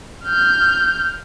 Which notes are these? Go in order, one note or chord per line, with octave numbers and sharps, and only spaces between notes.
F6 G6